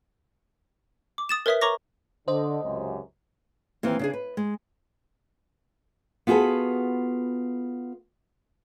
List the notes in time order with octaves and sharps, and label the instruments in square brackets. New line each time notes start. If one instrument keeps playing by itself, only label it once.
[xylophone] D6
D#6 A6 E7
A#4 B4 C#5 E5 D#6 B6
A#4 C#5 A#5 C#6 D6 A#6
[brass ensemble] D3 [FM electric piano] C5 D#5
[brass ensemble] C#2 F#2 C3
[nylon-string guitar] D#2 E3 C4 F5
C#3 D4 G#4
B4
G#3
B3 F4 F#4 G#4 A4 B4